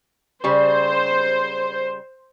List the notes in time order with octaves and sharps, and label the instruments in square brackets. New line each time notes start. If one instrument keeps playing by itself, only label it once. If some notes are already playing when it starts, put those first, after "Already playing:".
[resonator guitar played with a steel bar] C#3 G3 [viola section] C5